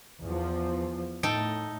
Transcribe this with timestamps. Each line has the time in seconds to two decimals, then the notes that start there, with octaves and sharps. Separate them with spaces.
0.23 E2 F3
1.23 A2 D#4 A4 G5